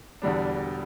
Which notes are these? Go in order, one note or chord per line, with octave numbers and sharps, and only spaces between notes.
E1 E2 D3 G3 D4